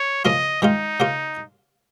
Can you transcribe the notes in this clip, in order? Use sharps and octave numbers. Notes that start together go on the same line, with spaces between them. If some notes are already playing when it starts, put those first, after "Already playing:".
Already playing: C#5
C#3 F3 A#3 F4 D#5
D#3 G#3 D#4 F4
C#3 A#3 F4